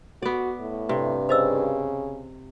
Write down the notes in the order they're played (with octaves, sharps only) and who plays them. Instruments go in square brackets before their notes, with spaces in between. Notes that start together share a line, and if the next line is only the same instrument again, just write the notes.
[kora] B3 D5 [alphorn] F#4
[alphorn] A2
[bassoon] G2 [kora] C3
[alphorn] C#3 [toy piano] C5 D#5 E6